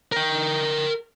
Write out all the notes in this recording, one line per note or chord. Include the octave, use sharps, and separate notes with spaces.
A#4 G5